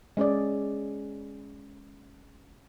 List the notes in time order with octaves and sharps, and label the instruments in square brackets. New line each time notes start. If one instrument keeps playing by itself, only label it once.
[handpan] G#3 C#4 G#4 D5